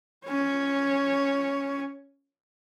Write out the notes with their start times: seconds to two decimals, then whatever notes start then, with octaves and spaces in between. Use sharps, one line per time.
0.26 C#4 C#5